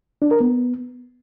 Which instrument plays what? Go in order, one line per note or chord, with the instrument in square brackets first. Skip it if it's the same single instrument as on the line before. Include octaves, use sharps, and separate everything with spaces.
[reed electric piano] D4
A#4
B3